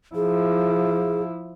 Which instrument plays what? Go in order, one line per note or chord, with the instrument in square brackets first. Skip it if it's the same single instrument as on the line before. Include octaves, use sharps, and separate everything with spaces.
[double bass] F3 E4 [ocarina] G#4